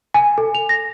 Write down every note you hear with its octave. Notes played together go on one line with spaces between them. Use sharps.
G#5
A4
F7
A#6